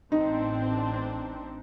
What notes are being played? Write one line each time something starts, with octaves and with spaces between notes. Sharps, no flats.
A1 C4 D4 D#4